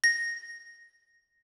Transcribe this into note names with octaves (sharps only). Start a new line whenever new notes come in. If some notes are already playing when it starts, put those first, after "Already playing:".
A#6